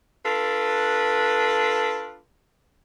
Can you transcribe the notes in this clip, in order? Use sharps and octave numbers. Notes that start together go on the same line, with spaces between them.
D4 F4 A4 B4